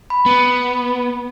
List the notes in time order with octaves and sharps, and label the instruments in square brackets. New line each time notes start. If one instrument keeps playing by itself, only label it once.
[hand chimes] B5
[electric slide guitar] B3